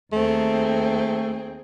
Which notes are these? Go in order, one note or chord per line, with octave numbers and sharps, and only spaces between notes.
D#2 A3 C4 G#4